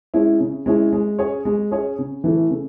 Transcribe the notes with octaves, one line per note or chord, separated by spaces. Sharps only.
G#3 C#4 E4
C#3
G#3 C#4 E4
G#3
C#4 G#4 C#5
G#3
C#4 G#4 C#5
C#3
E3 A3
C#3